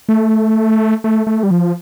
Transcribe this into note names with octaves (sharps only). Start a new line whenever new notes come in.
A3
A3
A3
G3
F3